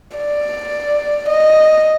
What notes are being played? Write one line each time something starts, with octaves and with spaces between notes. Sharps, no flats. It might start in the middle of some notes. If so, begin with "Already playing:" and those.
D5
D#5